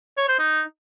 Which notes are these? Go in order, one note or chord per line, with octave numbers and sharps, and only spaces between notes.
C#5
C5
D#4